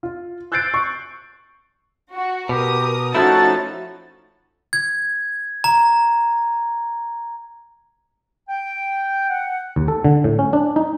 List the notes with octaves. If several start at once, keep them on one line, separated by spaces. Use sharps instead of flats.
F4
E6 F#6 G6 A6 C7 D7
C#6
F#4
B2 G4 A#4 D#6
F3 A3 C#4 D#4 E4 F#4 A5 A6
G#6
A#5
G5
F#5
D#2
A4
D3
A2
C#4
D4
D#4